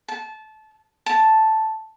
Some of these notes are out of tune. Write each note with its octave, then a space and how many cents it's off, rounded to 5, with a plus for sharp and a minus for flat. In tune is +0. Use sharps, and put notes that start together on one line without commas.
A5 -20
A5 +0